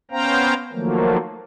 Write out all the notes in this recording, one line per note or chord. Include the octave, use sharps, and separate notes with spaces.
B3 C#4 C5 F5 G5 A#5
D#3 F3 F#3 A3 A#3